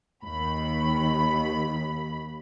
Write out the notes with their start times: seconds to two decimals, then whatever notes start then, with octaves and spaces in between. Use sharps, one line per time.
0.24 D#2 B5